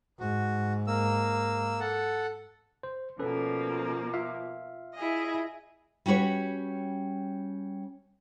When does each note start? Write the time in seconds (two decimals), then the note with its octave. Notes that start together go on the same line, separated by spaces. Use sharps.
0.20 G#2 F#4
0.87 A#3 E6
1.80 A4 F#5
2.83 C5
3.19 B2 F3 A#3 C#4 A4 B4
4.14 F4 E5 F5
4.94 E4 G#4 D#5
6.06 G3 C#4 F#4 B4 C#5